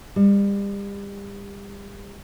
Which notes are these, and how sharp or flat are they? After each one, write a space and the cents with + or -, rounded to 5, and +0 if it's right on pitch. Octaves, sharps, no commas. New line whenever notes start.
G3 +35